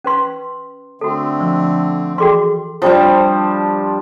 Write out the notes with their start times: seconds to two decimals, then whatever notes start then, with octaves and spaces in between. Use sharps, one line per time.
0.05 C#4 B4 C6
1.01 D3 A3 C4 F#4 A4
1.41 F3
2.18 E3 F#4 G#4 A4 G5 C6
2.82 F3 G3 D4 C5